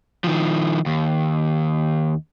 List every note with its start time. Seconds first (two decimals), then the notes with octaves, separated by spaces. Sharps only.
0.24 D#3 F3
0.86 D#2